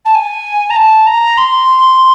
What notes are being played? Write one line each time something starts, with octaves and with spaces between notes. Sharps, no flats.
A5
G#5
A#5
A5
A#5
C6